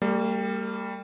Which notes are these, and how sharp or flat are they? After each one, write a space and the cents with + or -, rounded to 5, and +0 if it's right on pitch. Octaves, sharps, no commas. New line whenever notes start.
G3 +15 A#3 -40 G#4 +0